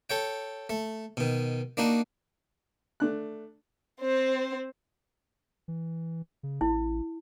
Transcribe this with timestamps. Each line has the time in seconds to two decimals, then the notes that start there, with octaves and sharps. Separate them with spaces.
0.10 A4 C#5 G5
0.70 A3
1.17 B2 D#3
1.77 A#3 D4 D#4 F#4
3.00 A3 D4 F#6
4.00 C4 C5
5.68 E3
6.43 C#3
6.61 A1 E4